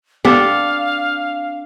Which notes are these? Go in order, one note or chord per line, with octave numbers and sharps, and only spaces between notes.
B3 C4 D4 G4 A4 F5